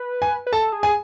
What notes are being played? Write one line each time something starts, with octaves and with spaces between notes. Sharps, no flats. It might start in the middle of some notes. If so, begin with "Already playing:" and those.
Already playing: B4
G#5
B4
A4 A5
G#4
G#5